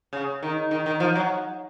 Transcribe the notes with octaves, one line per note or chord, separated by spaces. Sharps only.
C#3
D#3
D#3
D#3
F3
F#3